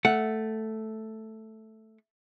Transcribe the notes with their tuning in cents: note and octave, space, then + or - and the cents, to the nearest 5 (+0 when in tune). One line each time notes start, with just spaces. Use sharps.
A3 +0 F#5 +0